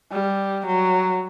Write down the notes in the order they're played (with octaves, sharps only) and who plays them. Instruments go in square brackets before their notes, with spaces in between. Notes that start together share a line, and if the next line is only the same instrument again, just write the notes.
[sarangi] G3
F#3